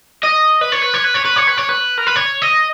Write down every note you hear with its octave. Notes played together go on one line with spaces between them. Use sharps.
D#5
B4
C#5
B4
C#5
B4
C#5
B4
C#5
B4
C#5
B4
A#4
B4
C#5
D#5